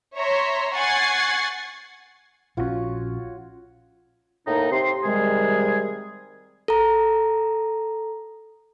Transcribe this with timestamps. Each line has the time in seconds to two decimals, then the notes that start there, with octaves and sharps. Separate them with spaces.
0.16 C#5 E5 A#5 C6
0.75 F#5 G#5 C#6 G#6 A6 C7
2.57 A#1 D3 C#4 F4 F#4 C#5
4.47 A2 A#3 D#4
4.71 C3 C6
5.04 C3 D#3 G3 G#3 G#4
6.68 A4 A#5